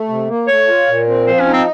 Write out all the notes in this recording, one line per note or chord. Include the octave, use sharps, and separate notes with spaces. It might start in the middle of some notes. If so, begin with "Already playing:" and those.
Already playing: A3
C3
A#3
A3 C#5
F4
A#2
C4
F3 C5
C#4
D#4
C4